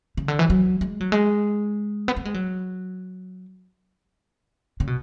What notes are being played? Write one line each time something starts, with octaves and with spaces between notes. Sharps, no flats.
C#3
D3
E3
F#3
G#3
F#3
G#3
B3
A3
G#3
F#3
C#3
B2